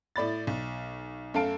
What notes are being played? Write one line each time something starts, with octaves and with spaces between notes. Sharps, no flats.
A2 D5 B5 A6
B1
F#2 A3 A4 F5 A5 D7